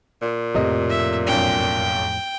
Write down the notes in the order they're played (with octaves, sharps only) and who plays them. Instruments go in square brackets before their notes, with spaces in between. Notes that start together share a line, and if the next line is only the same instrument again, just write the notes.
[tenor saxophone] A#2
[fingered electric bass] F2 A2 F3 [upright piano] C3 D#5
[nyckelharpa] E5
[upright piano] B1 F#2 [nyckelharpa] G5